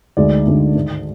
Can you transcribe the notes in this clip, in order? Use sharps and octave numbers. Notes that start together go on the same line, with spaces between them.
D2 D3 G#3 D#4 D5
D2 D3 G#3 D#4
G#2 D#3 G#3